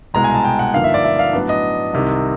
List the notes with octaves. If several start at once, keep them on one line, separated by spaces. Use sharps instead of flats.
C2 B2 G#3 A#5
G#5
A5
G5
F#5
G2 D3 F3 A#3 D#4 F5
E5
D5
E5
F5
A2 F#3 B3 D4
D#5
C2 C3 D#3